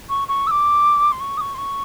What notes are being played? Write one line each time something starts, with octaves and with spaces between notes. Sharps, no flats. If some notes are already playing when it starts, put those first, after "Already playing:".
C#6
C#6
E6
D6
C6
C#6
D#6
C#6
C6
C#6